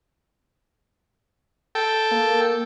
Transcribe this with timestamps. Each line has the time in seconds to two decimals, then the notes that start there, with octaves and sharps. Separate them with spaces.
1.75 A4 G5
2.11 A#3